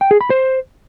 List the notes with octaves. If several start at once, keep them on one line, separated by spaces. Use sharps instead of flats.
G5
G#4
B5
C5